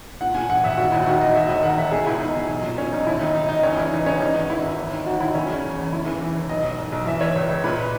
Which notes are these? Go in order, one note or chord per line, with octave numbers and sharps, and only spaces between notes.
A#2 F#5
A#2 G#5
A#1 F#5
A#1 E5
D#3 F#4
D#2 E4
D#3 F#4
D#2 D#5
D#2 E5
E1 D#5
D#3 F#5
D#3 E5
B2 G#4
C#2 E4
C#2 D#4
B2
B1
A#2
A#2 C#4
B1 D#4
D#2 E4
D#3 D#4
D#3 D#4
D#3 D#4
C#2 C#4
E3 E4
E3 D#4
C#2 C#4
E3 D#4
G#1
G#1 E4
G#1
D#2
D#3
D#2 F#4
D#3 E4
F#1 C#4
C#3
E2
E2
C#3 E4
E3
E3
D#2
B1 D#5
B1
B1
B1
E3 E5
E3 C#5
C#2
C#2
A#2 B4